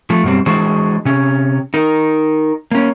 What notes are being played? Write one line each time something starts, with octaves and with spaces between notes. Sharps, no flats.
F3 A3
F#2 B2 G3 C4
E3 G#3 D4 F#4 G#4 C5
C3 C#4
D#4 A#4
A#3 C#4